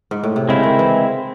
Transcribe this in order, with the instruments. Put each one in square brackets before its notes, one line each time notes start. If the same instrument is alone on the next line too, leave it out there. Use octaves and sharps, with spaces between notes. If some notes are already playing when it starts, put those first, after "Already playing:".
[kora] G#2
A2
C3
[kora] C#3 [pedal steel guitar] G#3 C4 E4
[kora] D#3
E3